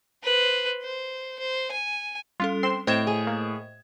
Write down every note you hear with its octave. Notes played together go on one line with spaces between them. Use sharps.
B4 C5
C5
C5
G#5
G3 C#4 F4 A4
C4 C6 E7
A2 C4 C5 D#5 G#6 D7 E7
G#4
A#3